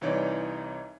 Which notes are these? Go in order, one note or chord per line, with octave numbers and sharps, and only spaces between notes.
C2 E3 D#4 C#5 D5